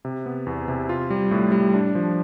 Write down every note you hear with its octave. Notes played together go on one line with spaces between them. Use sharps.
C3
B3
E2
C3
F4
G3
A2
G3
D4
F3